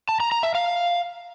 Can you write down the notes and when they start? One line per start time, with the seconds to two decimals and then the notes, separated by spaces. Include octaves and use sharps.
0.09 A5
0.20 A#5
0.32 A#5
0.43 E5
0.55 F5